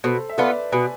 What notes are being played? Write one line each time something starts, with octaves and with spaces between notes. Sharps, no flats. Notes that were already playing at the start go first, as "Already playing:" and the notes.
B2 A4 C5
E5
B3 F4 A4 B4 D5
B2 G#5 B5